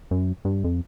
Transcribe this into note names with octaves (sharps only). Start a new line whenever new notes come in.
F#2
G2
F2